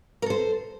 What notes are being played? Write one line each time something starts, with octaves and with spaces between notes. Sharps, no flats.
A4 A#4 C5